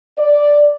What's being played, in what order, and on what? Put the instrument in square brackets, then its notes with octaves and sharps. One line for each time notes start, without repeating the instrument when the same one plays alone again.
[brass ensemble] D5